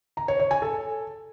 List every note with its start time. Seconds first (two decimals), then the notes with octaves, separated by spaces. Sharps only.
0.17 A#5
0.28 C#5
0.40 C#5
0.51 G#5
0.62 A4